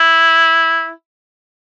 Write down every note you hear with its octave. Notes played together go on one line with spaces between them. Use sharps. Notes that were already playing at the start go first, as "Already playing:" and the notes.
Already playing: E4